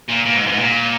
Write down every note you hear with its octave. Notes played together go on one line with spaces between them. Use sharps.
A#2
A#2
G#2
F#2
G#2
A#2